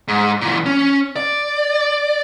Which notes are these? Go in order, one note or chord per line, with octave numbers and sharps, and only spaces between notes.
G#2
A#2 E3
C#4
D5